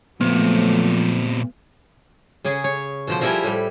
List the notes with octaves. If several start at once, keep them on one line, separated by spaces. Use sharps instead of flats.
A#2 F3 F#3 A3 B3 C4
C#3 C#4 G#4
C#5
B2 F3 C5
F3 G3 E4 G4 A#4 G#5
A2 G3 G4